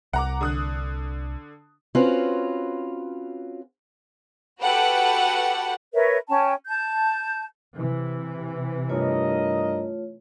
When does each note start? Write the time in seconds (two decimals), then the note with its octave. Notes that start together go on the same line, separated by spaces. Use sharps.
0.13 C2 F#5 A#5 D6
0.41 D3 D#6 F#6
1.95 C4 C#4 F4 F#4 B4
4.61 F#4 G4 A4 B4 F#5
5.93 A#4 B4 C#5 E5
6.29 C#4 G5 A5
6.67 A5 G6
7.77 C3 E3
8.89 G2 A3 F4 A#4 C#5 D#5